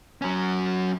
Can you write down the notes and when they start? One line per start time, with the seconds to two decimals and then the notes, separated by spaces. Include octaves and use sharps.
0.22 F#3 C#4